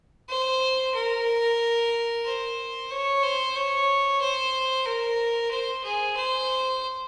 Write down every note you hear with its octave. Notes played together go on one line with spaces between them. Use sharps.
C5
A#4
C5
C#5
C5
C#5
C5
A#4
C5
G#4
C5